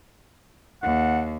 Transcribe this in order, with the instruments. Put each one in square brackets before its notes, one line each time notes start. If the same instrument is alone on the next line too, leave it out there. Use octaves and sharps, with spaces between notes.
[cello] D#2 [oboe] F#5